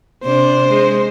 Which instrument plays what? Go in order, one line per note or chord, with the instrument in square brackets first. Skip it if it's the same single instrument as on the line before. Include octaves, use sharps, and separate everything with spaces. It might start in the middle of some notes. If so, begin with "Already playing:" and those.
[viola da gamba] C3 D4 [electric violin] C5
[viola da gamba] G#3